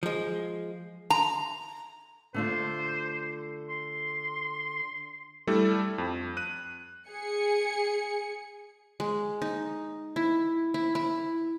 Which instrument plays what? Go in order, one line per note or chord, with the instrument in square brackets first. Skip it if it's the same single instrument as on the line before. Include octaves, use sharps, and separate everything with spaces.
[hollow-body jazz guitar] F3 G#3
[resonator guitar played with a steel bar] A#5
[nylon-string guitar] D3 A3 F4 [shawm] C5
[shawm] C6
[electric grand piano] G3 A3 D4 E4 A4
F2
F#6 D#7
[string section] G#4 C#7
[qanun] G#3
D#4
E4
E4
E4